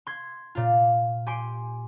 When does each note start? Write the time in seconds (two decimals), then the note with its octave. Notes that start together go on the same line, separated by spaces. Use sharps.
0.07 C6 G#6
0.55 A#2 F4
1.26 G4 G#5 C6 D7